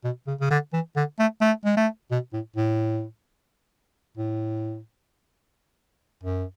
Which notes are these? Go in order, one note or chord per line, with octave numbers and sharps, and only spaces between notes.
B2
C#3
C#3
D3
E3
D3
A3
A3
G#3
A3
B2
A2
A2
A2
F#2